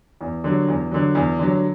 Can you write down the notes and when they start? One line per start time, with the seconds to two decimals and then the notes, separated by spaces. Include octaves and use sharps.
0.21 E2
0.44 D3 F#3
0.68 E2
0.91 D3 F#3
1.15 E2
1.39 D3 F#3